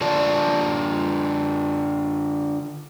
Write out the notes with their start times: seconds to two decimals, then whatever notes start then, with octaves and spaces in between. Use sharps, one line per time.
0.01 D3 F4 D5 A5